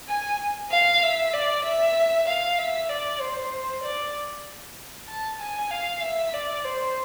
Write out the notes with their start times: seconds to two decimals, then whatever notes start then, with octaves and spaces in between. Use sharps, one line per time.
0.09 G#5
0.71 F5
1.03 E5
1.34 D5
1.65 E5
2.27 F5
2.58 E5
2.90 D5
3.21 C5
3.83 D5
5.08 A5
5.40 G#5
5.71 F5
6.02 E5
6.34 D5
6.65 C5